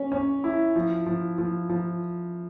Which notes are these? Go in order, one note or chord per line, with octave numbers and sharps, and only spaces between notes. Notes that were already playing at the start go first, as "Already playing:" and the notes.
Already playing: C#4
C#4
E4
F3
F3
F3
F3